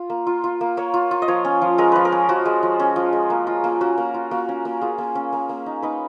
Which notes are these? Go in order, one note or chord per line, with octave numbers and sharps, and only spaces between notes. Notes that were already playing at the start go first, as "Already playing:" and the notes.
Already playing: F4
A#3
F4
F4
A#3
A#3 C#5
F4
F4
D#5
F3 C#5
C#4
F3
G#3 A#4
F3 B4
A#4
C#4
F3 F#4
G#3
F3
C#4
F3
G#3
A#3
F4
A#3
C#4 F#4
A#3
F4
A#3 F#4
C#4
A#3
F4 G#4
A#3
C#4
A#3
A#3
D#4
D#4 B4